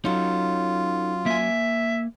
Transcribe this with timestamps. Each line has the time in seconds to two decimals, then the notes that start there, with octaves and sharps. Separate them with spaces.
0.05 F#3 C#4 D#4 F4 A4
1.26 A#3 E5 G#5